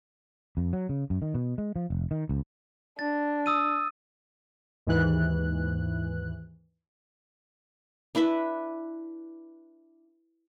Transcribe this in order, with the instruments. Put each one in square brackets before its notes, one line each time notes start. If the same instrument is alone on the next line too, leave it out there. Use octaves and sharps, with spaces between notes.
[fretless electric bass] F2
F#3
C#3
F#2
D#3
B2
G#3
F3
F1
D#3
C#2
[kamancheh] D4 [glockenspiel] A6
[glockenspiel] D#6 E6 D#7
[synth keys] D#2 G#2 E3 F#6
[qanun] D4 E4 B4 E5